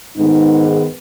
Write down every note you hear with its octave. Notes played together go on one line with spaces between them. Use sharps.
G#2 D#3 G#3 B3 D#4